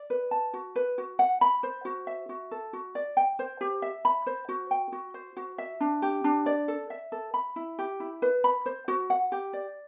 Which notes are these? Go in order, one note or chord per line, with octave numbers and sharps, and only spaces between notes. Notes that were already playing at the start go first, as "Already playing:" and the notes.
Already playing: D5
B4
A5
F#4
B4
F#4
F#5
B5
C5
F#4
E5
F#4
A4
F#4
D5
G5
C5
G4
E5
B5
C5
F#4
G5
F#4
C5
F#4
E5
D4
G4
D4
D5
A4
E5
A4
B5
E4
G4
E4
B4
B5
C5
F#4
F#5
G4
D5